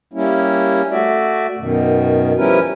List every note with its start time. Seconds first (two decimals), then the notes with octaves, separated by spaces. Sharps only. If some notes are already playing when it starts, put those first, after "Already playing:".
0.13 G3 A#3 C#4 E4
0.91 A3 F#4 D5 E5
1.58 F#2 B2 D#3
2.37 F3 G3 C#4 E4 A#4 B4